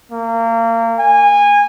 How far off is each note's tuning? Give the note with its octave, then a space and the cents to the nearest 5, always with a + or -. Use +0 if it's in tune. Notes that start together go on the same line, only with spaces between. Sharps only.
A#3 -30
G#5 -20